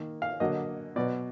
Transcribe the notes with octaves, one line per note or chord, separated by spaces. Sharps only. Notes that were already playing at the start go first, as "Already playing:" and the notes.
Already playing: D#3 A#3
F5
D3 F#3 A#3 D#5
B2 F#3 B3 D5